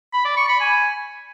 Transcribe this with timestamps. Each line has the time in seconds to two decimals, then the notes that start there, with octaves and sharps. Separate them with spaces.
0.13 B5
0.25 D5
0.37 C#6
0.49 B5
0.60 G#5